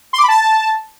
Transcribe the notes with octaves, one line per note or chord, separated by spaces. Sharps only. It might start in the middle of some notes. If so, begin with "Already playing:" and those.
C6
D6
B5
A5